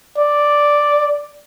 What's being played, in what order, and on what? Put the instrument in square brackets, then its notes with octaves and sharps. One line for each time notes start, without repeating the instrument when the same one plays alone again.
[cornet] D5